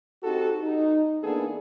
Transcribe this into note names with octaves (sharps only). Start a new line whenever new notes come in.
C4 D#4 F#4 G4 A4
D#4
E3 A#3 B3 D4 G#4 A4